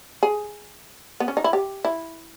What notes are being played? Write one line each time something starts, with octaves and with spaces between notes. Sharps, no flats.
G#4
B3
C#4
D#4
E4
G4
E4